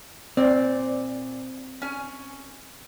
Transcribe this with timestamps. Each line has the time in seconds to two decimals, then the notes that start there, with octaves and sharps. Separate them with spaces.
0.37 A#2 C4 D5
1.82 C#4 G#5